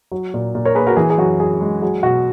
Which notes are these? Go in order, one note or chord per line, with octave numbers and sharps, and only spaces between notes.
F#3
A#2
A#2
A#4 C#5
A#3 G#4 B4
F#4 A#4
E3 G#4
G#4
F#2 F#4
F#2 G#4
G#3
F#3 G#4
B2 F#4